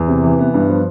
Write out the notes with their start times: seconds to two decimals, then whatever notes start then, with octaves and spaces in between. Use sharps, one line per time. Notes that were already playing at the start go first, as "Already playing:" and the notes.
Already playing: E2
0.08 C3
0.24 E3
0.39 B3
0.54 G2
0.70 F3